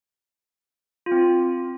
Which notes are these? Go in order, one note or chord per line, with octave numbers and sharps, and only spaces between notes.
F4
C4
F4